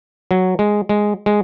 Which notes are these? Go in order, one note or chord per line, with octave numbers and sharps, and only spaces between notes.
F#3
G#3
G#3
G#3